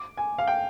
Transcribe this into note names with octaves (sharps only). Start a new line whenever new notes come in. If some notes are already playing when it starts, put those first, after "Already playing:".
Already playing: D6
G#5
F5
G5